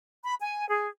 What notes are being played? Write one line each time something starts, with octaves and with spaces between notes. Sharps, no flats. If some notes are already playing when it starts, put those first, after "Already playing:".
B5
G#5
G#4